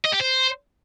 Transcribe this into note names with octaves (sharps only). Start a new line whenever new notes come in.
D#5
G4
C5